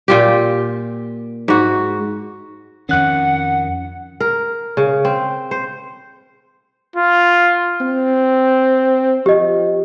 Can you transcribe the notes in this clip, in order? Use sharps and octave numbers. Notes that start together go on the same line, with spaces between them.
A#2 F4 G4
G#2 F#4
F2 D#3 C#4 F#5 F#6
A#4
C#3
C4
C5
F4
C4
F3 G4 D#5